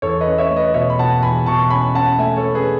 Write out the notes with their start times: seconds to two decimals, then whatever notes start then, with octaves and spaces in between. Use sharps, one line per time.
0.02 E2 A4 C#5
0.21 B4 D#5
0.27 C#4
0.38 C#5 E5
0.50 A3
0.56 B4 D#5
0.74 B2 C#5 E5
0.90 B5
0.98 B2 F#5 A5
1.23 E2 G#5 B5
1.46 B2 A5 C#6
1.70 C#4 G#5 B5
1.95 C#4 F#5 A5
2.18 A3 E5 G#5
2.37 A4 C#5
2.43 C#4
2.54 G#4 B4